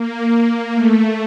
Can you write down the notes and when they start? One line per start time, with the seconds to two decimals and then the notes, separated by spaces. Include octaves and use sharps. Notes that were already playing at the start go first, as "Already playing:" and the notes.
Already playing: A#3
0.74 A3